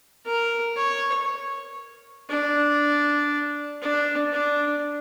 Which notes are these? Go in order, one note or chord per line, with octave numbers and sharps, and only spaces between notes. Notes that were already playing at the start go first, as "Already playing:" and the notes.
A#4
C#5
D4
D4
D4